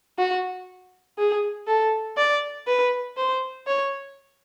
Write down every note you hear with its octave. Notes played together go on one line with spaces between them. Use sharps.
F#4
G#4
A4
D5
B4
C5
C#5